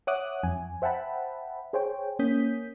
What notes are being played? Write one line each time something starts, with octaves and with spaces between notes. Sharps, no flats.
C#5 E5 F#5 D6 D#6 F#6
F2 G#5
C5 E5 F#5 G5 A5 B5
G#4 C5 C#5 G5
A#3 C#4 D#6 G6 B6